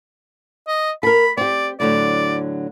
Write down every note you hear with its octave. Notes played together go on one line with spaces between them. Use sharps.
D#5
A4 A#4 B5
C4 G4 D5
A2 D3 F#3 D5